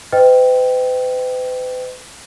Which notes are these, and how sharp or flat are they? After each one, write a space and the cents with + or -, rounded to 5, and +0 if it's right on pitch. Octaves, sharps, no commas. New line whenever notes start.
B4 +45 D#5 +0 G5 +0